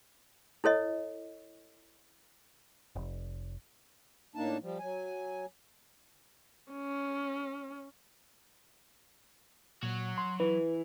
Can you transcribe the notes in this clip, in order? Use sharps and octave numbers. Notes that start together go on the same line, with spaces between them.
E4 A4 C#5 D#5
F1
A2 A#3 D4 D#4 A5
F3 G3
F#3 G#5
C#4
A#2 F#3 F#4
C6
E3 B4